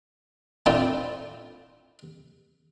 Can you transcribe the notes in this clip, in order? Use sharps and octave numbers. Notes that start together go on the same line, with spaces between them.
A3 C4 D4 E4 F4